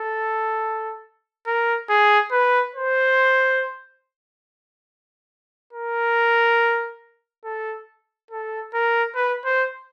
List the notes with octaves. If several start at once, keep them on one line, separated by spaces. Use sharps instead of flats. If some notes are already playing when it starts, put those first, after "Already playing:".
Already playing: A4
A#4
G#4
B4
C5
A#4
A4
A4
A#4
B4
C5